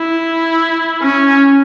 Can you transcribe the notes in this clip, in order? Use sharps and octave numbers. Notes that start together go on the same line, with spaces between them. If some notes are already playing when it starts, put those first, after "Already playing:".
Already playing: E4
C#4